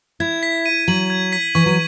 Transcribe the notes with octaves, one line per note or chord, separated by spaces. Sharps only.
E4 G#6
B6
D#7
F#3 F#7
G#6
B6
E3 C#6
F#3